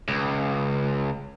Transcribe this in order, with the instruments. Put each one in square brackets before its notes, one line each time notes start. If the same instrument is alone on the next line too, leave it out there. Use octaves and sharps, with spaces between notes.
[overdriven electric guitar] C#2